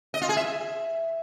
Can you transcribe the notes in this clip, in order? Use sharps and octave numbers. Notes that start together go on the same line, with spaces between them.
D#5
F4
G#4
E5